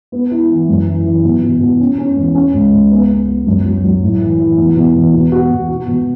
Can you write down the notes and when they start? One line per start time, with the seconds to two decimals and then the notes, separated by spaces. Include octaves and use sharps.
0.12 B3
0.31 E4
0.50 E3
0.69 F#2
0.87 E3
1.05 E3
1.24 B2
1.43 B2
1.60 B2
1.80 C#4
1.98 C#4
2.16 E2
2.35 C#4
2.54 C#2
2.72 C#2
2.91 B3
3.09 B3
3.28 B3
3.46 F#2
3.65 F#3
3.84 F#3
4.02 A2
4.21 E3
4.39 E3
4.58 E2
4.76 B2
4.95 E2
5.13 B2
5.32 F#4
5.50 B2
5.68 F#4
5.87 B2